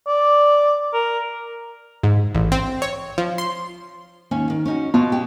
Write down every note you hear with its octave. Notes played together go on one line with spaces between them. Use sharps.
D5
A#4
G#2
A1
C4
C#5
F3
C6
D#2 C#4 G#5
D#3
C#4 D#4 F#4
B2 F4
G4